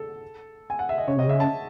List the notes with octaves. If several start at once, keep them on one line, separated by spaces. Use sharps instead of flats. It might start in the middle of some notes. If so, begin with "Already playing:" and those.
Already playing: A4
G#5
F#5
E5
D#5
C#3 C#5
C3 D#5
C#3 E5
A5